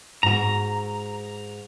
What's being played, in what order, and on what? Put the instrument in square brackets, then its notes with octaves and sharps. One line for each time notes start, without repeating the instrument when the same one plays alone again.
[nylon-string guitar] G#2 F#4 [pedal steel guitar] A#5